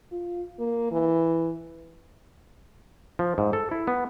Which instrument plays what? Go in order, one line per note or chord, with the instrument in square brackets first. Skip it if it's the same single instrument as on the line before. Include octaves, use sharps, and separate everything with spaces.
[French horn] F4
A#3
E3
[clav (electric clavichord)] F3
G#2
A4
E4
B3